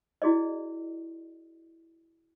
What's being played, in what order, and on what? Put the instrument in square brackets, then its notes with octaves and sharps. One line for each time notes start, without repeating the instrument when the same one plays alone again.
[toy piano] E4 F#4 G#4 D5 D#5